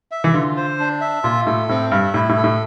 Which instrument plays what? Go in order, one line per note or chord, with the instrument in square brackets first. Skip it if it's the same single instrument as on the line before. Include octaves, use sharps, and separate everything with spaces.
[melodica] E5
[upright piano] E3
[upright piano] D3 [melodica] F4
[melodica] C5
D4
E5
[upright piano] A#2 [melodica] F4
[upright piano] A2 [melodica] A4
[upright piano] A2 [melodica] C4
[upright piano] G2 [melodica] E5
[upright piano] A2 [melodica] E4
[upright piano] A2
[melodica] A4
[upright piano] A2